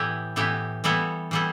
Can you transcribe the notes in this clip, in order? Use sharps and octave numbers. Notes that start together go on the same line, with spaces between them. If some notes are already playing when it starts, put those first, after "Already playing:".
Already playing: A2 E3 B3 E4 G4
A2 E3 B3 E4 G4
E3 G3 B3 E4 A4
E3 G3 B3 E4 A4